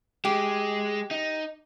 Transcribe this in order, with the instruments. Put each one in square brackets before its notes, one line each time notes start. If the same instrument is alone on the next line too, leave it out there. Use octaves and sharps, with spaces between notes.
[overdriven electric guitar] G#3 [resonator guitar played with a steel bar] G4
[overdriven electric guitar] D#4